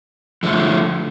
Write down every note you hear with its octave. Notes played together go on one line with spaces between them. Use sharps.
D3 F3 A3